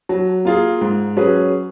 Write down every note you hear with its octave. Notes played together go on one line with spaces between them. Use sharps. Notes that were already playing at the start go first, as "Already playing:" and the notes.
F#3
A#3 F4 G#4
G#2
F#3 C#4 G#4 B4